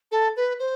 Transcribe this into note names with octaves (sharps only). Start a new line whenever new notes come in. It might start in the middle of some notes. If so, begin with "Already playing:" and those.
A4
B4
C5